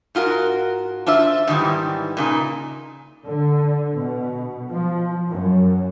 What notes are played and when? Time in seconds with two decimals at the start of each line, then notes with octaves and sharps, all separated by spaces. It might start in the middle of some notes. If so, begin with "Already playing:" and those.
0.15 G#2 F4 F#4 A#4
1.07 D4 F4 C5 E5
1.47 G#2 D#3 E3 G3
2.17 A#2 C#3 D#4
3.28 D3
3.96 B2
4.70 F3
5.29 F#2